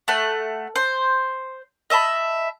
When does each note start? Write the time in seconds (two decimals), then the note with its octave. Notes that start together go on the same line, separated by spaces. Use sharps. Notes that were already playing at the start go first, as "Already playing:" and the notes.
0.08 A3 F#5
0.76 C5
1.90 D#5 E5 A5 B5